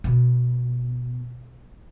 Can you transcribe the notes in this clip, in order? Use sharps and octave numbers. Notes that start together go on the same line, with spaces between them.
B2